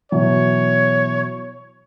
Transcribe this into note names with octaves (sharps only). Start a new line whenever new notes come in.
B2 E3 F#3 C#5